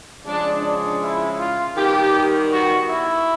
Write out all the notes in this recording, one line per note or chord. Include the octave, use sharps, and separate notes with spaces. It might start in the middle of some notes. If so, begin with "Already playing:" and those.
C#3 F3 G#3 D4
D4
E4
F4
D#3 G3 B3 G4
F#4
E4